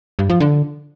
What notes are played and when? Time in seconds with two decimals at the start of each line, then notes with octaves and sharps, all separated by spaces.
0.19 G2
0.30 F3
0.40 D3